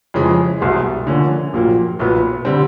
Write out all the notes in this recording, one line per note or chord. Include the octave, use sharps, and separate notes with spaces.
F2 C#3 E3 G#3
C2 B2 G#3
D3 F3 A#3 C#4
A#1 A#2 F#3 A#3
B1 A#2 F#3 B3
D3 G3 C4